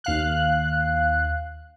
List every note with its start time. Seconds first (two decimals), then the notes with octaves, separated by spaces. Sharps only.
0.04 D#2 F5 F#6